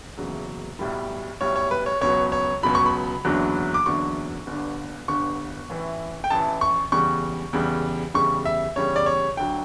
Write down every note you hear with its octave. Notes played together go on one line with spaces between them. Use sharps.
F#1 E2 C#3 F#3
B1 A2 G3
B1 A2 G3 C#5
C#5
B4
C#5
C#2 B2 F#3 C#5
C#5
C#2 B2 F#3 B5
C#6
B5
F#1 E2 D3 F#3
D6
F#1 E2 D3 F#3 C#6
G1 G2 D3
G1 G2 D3 C#6
A1 A2 E3
G5
A1 A2 E3 A5
C#6
E2 C#3 G3 C#6
E2 C#3 G3
E2 C#3 G3 C#6
E5
E2 C#3 G3 C#5
D5
C#5
D2 D3 F#3 G5